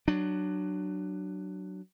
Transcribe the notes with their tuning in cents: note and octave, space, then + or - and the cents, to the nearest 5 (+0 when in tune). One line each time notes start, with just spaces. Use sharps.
F#3 +15 D4 +20